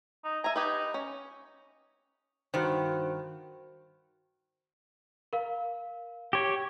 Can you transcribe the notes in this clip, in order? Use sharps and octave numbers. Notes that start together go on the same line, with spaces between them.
D#4
E5 G#5 A#5
D#4 G4 B4
C#4
G2 D#3 F#4 C5
A#4 F5
G4 C#5